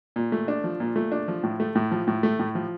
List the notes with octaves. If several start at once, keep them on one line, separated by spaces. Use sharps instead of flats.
A#2
A3
D4
F3
A#2
A3
D4
F3
A2
A3
A2
F3
A2
A3
A2
F3